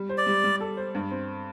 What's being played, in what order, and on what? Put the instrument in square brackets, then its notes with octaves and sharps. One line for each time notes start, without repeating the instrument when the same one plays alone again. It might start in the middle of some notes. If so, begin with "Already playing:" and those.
Already playing: [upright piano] G3
C5
[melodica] D5
[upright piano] G3
G3
A4
C5
G2
C4